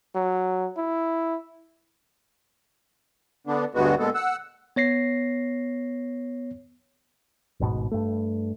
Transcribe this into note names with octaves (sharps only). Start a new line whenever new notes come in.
F#3
E4
D3 B3 D4
D2 G2 G#3 B3 F#4
A#2 G#3 B3 A4
F#5 E6
B3 C#5 A#6 C7
D1 G#1 G#2 B2
G2 A3